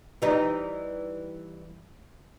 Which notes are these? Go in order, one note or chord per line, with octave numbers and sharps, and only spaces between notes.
E3 G3 D#4